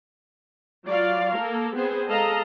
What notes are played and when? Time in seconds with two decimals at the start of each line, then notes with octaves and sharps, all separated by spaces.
0.86 F#3 F4 D5 F5
1.35 A#3 A4 A#4
1.75 B3 C4 G#4 C5
2.08 G#3 A4 D#5 F5 A#5